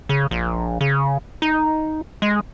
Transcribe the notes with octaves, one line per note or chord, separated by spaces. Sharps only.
C#3
A#1
C#3
D#4
G#3